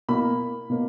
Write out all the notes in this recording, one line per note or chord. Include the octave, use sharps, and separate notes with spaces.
B2 A#3 B5
B2 A#3